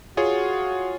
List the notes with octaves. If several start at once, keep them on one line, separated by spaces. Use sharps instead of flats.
F4 F#4 G#4 C#5